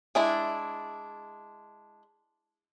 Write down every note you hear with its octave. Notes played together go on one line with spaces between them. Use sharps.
G#3 D4 E4